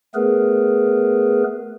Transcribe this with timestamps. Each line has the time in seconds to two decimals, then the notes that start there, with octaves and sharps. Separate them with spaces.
0.15 A3 B3 G#4 A#4 B4